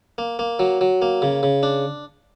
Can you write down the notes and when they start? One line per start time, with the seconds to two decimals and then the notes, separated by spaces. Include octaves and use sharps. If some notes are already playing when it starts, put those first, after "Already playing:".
0.18 A#3
0.39 A#3
0.59 F#3
0.81 F#3
1.02 A#3
1.22 C#3
1.43 C#3
1.63 D4